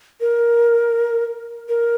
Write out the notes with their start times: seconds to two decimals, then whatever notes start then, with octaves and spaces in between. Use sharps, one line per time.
0.21 A#4
1.69 A#4